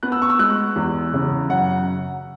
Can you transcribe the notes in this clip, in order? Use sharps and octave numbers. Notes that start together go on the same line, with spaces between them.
B3 F#6
E6
C#6
E6
G#3 F#6
E2
C#3
F#2 F#5